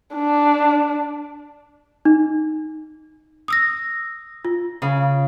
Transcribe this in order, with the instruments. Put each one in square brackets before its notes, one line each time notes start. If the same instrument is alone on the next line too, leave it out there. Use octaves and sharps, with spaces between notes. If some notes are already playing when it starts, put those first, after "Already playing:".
[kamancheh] D4
[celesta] D#4
D#6 E6 A#6
F4
[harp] C#3